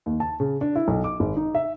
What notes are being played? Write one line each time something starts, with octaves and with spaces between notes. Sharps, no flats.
D#2
A5
C#3
D4
E4
B1
D6
G#1
D#4
E5